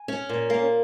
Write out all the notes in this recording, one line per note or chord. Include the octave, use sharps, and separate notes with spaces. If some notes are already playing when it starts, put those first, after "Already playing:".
Already playing: G#5
C#4
A#2
A#3